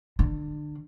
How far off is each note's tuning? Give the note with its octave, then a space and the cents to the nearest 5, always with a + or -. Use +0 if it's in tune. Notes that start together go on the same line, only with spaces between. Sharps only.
D3 +30